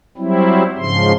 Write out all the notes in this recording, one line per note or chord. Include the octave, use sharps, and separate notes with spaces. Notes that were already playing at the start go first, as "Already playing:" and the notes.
F#3 G3 C4 E4
G#2 C#3 F3 C6